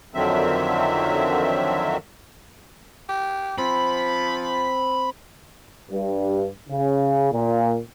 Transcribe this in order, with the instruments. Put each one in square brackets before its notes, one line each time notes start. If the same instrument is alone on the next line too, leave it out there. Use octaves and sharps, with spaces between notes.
[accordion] F2 D3 D#3 F#3 C4 E5
[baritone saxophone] G4
[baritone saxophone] F3 [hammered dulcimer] C4 [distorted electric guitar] B5
[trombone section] G2
C#3
A#2